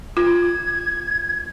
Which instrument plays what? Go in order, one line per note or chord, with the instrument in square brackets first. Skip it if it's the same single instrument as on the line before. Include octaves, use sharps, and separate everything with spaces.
[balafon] F4 [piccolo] G#6